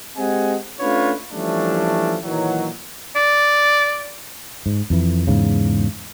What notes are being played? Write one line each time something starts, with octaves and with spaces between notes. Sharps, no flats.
G#3 C4 G4 D#5 F#5 G#5
A3 C#4 D4 F4 B4 C#5
E3 F3 G3 A3 C#4 D4
A#2 D#3 E3 F#3
D5
G#2
F2 E3
E2 G#2 C#3